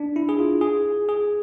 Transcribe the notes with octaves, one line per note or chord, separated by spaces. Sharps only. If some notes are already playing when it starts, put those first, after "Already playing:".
Already playing: D4
E4
G#4
F4
G#4
G#4